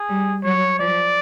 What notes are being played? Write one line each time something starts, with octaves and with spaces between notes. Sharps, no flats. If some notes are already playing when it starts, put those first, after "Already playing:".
Already playing: G#4
G3
F#3 C#5
F3 D5